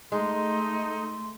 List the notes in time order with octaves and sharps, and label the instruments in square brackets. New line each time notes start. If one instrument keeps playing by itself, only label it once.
[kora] G#3 [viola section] A3 [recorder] D#4 [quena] C6